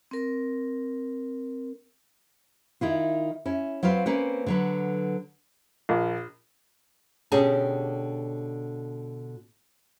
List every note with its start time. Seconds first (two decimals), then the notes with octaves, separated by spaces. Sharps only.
0.11 C4 A#4
2.81 D#3 E4 F4
3.45 C#4 E4
3.83 F#3 C4 F4 B4 F5
4.06 A#3 C4 C#4 B4
4.46 D3 F#3 B4
5.89 A#1
7.32 B2 D3 C#4 G4 G#4 A5